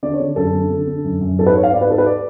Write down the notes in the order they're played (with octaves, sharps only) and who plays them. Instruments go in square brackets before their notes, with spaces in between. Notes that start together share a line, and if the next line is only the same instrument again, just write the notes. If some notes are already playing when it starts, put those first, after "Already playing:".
[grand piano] D3 D5
C#5
D3
F#2 A4
D3
D3
D3
F#2
F#2
G#2 A4
B4
G#2 C#5
F5
G#2 D5
B4
G#2 A4
B4
D5